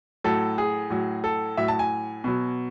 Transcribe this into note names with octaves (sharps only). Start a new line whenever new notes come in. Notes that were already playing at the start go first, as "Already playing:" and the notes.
A2 F#3 A4
G#4
A2 F#3
A4
A2 F#3 E5
A5
G#5
B2 F#3